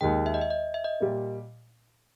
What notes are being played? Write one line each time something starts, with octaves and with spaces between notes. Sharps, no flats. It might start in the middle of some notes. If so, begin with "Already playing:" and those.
D#2 D#3 G#3 G5
E5
D#5
E5
D#5
E5
D#5
A#2 G3 A#3